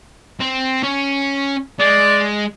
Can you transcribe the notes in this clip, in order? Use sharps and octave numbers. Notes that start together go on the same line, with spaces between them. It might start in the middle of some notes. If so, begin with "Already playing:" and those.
C4
C#4
G#3 D5